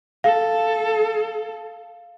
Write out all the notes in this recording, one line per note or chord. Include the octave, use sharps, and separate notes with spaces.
A4 F5